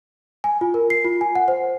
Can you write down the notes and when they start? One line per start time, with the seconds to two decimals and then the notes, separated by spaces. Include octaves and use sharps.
0.44 G#5
0.61 F4
0.74 A#4
0.90 C7
1.05 F4
1.21 G#5
1.35 F#5
1.48 C5